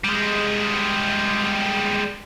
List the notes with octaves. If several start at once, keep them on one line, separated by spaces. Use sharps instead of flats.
G3 G#3